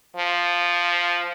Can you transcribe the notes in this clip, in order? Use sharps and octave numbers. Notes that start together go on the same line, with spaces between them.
F3